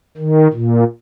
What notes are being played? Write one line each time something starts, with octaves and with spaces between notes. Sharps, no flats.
D#3
A#2